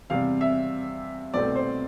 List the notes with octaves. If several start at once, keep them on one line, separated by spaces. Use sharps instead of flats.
E2 C3 G3 F5
E5
C2 B2 A3 C4 D5
C5